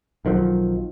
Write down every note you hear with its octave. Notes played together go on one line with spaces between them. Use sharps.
B1 D#3 F3 F#3